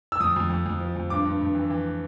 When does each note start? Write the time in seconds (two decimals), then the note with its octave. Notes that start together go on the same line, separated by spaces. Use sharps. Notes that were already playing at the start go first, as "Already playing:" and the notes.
0.12 E6
0.20 F2 D#6
0.36 F2
0.50 F2
0.66 F2
0.80 F3
0.96 F2
1.10 G2 D6
1.25 G2
1.41 G2
1.55 E3
1.70 E3